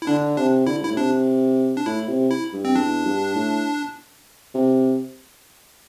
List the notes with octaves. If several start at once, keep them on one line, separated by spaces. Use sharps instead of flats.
E4
D3 D4
C3 D4
D3 E4
G2 E4
A2
C3 D4
D4
A2 E4
C3
E4
G2
C4
E2 D4
G2
A2
C3